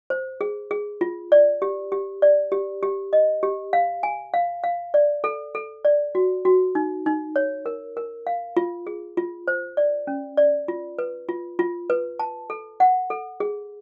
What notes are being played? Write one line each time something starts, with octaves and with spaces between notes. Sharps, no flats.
C5
G#4
G#4
F4
D5
G4
G4
D5
G4
G4
D#5
G4
F5
G#5
F5
F5
D5
A4
A4
D5
F#4
F#4
D#4
D#4
C#5
A#4
A#4
F5
F4
G#4
F4
C5
D5
C#4
D5
F4
B4
F4
F4
B4
A5
A4
F#5
A4
G#4